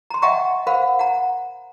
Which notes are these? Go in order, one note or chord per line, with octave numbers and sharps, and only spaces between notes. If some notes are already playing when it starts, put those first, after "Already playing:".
A#5 C6
D#5 E5 F#5 G5 A#5 C#6
A#4 C5 F5 F#5 B5
F#5 A#5